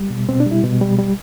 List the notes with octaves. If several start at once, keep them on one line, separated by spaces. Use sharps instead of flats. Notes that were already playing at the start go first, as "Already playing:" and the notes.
Already playing: G3
B2
B2 C4
D4
G3 E4
B2
G3
G3